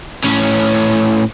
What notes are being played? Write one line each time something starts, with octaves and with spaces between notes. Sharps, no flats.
A2 C#4